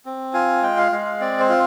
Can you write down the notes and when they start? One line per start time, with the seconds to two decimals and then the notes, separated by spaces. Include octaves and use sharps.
0.06 C4
0.33 F4 G#5
0.63 G#3 G5
0.78 F5
0.92 G#3 F5
1.06 F5
1.20 C4 D5
1.40 C5
1.49 F4